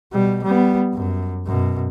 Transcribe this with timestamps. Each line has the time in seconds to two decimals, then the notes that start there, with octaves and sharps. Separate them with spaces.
0.12 B2 G3
0.43 G3 B3
0.93 F#2
1.46 F#2 B2